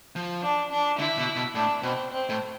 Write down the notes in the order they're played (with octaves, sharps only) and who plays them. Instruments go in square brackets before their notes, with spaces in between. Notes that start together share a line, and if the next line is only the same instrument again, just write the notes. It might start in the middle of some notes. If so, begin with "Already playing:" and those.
[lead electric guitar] F3
[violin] D4
D4
[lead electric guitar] D3 [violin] E4
[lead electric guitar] B2
B2
[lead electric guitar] A2 [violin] D4
[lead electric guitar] B2 [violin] C4
[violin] C4
[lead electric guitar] A2